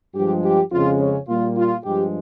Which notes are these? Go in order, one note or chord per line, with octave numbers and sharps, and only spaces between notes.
G2 F3 G#3 G4
G4
F2 C#3 G#3 F4
C#4
A#2 G3 A#3 F4
F4
G2 F3 G#3 G4